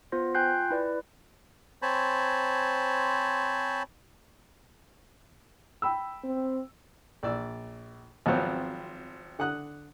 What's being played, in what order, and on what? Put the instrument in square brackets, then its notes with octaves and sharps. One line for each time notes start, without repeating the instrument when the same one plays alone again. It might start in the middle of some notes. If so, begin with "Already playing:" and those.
[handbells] B3 F4 C5 A#6
F4 G5 G#5 F#6 G6 C7
E4 B4 D5
[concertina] C4 C5 C#5 G#5 A5 B5
[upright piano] G5 B5 E6
[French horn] C4
[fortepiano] A#1 D5 E6
G#1 F3 F#3 B3 C4 C5
D3 F#5 D#6 F#6